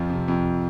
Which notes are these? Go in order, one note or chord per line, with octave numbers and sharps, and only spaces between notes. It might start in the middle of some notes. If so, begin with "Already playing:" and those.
Already playing: F2 F3
C3
F2